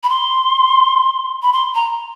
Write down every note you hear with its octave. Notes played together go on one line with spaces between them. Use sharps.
B5
C6
B5
C6
A#5